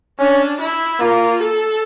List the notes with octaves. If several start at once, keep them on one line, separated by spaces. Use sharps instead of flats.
C#4 D4
E4
A#3 F4
A4